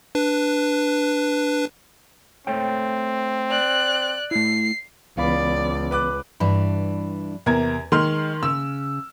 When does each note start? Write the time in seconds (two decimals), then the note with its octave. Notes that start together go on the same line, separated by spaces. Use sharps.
0.15 D4 B4
2.47 A3 C4 C#5 G5
3.51 D5 F#6
4.31 A3 E4 C7
5.17 C#2 E3 B3 D5 F5 B5
5.91 B4 D6 F#6
6.40 G2 E3 D4 B5
7.46 E2 C3 A#4 G#6
7.92 D#3 G#3 C6 F6
8.43 C#3 E6